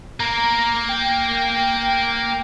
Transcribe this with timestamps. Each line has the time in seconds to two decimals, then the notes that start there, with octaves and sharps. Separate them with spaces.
0.20 A#3 A#5
0.89 G5